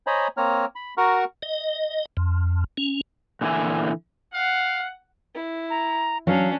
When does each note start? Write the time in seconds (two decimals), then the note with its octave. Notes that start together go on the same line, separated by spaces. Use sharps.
0.07 C5 C#5 D#5 G#5 A#5 B5
0.37 A#3 C4 C#5 A#5 F6
0.76 B5
0.98 F#4 A#4 F#5 A#5 C#6 F6
1.42 D#5
2.17 F2
2.77 C#4
3.41 A#2 D3 E3 E4 G#5
4.34 F5 F#5
5.35 E4
5.70 A#5
6.27 F#3 C#4 D4 F5